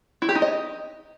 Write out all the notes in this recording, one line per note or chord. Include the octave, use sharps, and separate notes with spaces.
E4
G4
D#4
D#5